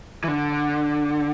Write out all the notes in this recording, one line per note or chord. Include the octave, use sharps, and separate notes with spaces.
E3
D3